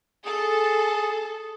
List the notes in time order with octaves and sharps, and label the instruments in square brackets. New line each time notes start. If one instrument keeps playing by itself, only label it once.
[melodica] G#4 [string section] A4